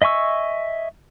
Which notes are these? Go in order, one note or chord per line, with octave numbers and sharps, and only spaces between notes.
D#5 E5 G#5 C#6 E6